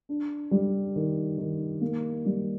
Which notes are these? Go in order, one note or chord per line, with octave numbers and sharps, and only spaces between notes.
D4
G3
D#3
D#3
A#3
G3